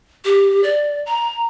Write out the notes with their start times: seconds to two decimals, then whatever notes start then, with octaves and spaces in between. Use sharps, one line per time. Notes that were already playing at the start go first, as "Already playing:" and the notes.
0.25 G4
0.64 D5
1.06 A#5